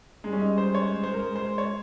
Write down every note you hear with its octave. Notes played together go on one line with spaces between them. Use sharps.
G3 G#3
C#4
D#4
C5
C#5
G#3
C5
A#4
G#3
C5
C#5